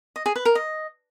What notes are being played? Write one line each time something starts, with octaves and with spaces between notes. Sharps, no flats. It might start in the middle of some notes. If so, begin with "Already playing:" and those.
D#5
G#4
B4
A#4
D#5